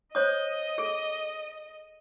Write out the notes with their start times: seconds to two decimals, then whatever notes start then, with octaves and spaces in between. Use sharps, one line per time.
0.15 C5 C#5 D#5 D#6
0.78 G#4 A4